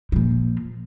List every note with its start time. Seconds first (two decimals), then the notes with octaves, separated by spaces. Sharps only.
0.12 A#2 F3